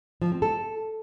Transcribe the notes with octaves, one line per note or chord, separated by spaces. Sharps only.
F3
C4
A4